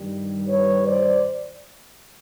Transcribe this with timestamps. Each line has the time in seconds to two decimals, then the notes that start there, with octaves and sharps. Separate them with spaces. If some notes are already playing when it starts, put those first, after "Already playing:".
Already playing: G2 D#3 G3
0.48 B4 C#5
0.86 C5 D5